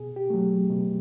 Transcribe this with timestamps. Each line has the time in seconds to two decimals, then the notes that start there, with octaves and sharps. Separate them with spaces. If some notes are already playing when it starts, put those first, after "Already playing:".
Already playing: B2 G#4
0.16 G4
0.30 F#3 A3
0.70 B2